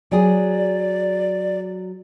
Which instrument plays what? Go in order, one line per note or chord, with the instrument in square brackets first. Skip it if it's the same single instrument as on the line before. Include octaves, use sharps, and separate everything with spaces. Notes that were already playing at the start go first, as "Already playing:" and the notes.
[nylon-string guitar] F#3 G#4 [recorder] D5